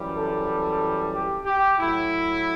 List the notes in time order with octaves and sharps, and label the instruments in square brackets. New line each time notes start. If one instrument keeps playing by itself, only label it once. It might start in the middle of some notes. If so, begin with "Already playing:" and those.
Already playing: [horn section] F#2 E3 G3
A4
G4
G4
A2 F#3 E4